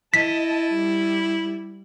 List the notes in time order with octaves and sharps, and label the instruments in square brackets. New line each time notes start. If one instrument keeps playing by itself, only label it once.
[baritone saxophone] E4 [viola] D#5 A5 [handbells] B6
[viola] G3